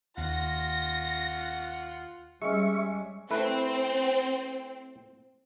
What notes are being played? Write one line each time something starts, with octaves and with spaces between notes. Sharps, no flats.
D#2 F4 F#5 A#6
G3 G#3 C#4 E5 C#6
A3 C4 E4 B4